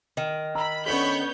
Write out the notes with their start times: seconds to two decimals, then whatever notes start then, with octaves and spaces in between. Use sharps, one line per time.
0.17 D#3
0.55 A#5 B5 E6
0.86 B3 C#4 D4 A4 C#5 B5 C#6 G6